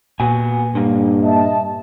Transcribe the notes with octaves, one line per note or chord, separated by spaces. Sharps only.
A#2 B3 F#4 G#5
G2 D3 A#3
D#5 E5 A5